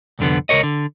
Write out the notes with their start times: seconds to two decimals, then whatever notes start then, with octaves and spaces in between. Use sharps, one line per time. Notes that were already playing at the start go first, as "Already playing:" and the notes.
0.19 C2 F2 D3 B3
0.49 C#2 G#2 A#4 C#5 D#5
0.63 D3